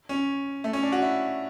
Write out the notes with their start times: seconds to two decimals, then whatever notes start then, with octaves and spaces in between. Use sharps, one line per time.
0.09 C#4
0.64 A3
0.73 C#4
0.83 D4
0.92 F#4
1.02 E4